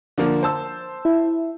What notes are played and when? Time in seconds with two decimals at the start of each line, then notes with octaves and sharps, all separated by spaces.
0.18 D3 F3 A#3
0.43 C5 A5 E6
1.05 E4 E5